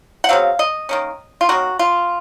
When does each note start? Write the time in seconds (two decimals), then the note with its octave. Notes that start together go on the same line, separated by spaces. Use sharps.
0.24 F#5
0.29 C#3 F#3 C4 F5
0.59 D#5
0.89 D#3 A#3 C#4
1.41 F4
1.49 D#3 A#3 C#4 F#4
1.79 F4